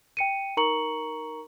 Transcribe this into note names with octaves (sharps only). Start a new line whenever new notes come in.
G5 C#7 D#7
D#4 A#4 A#5 C#6 C#7 F#7